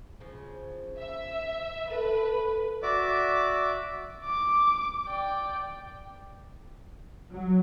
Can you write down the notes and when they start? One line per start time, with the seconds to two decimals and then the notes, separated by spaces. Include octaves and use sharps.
0.20 C#3 F3
0.98 E5
1.90 A4 B4
2.83 F#4 D5 E5 D6
4.25 D6
5.07 D5 G5
7.33 F#3